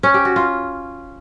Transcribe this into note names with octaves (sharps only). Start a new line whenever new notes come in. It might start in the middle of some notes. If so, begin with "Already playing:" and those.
C#4
G4
F#4
F4